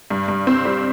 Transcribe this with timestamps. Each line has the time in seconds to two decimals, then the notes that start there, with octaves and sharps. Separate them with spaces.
0.11 G2
0.28 G2
0.47 C4
0.65 G3